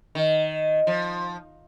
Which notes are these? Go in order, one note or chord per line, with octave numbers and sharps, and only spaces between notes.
D#3
F3